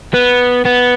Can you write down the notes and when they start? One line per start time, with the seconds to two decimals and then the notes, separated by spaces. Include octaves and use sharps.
0.14 B3
0.65 B3